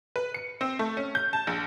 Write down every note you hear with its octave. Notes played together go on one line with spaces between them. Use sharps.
B4
C#7
C4
A3
C#4
G6
A5
A#1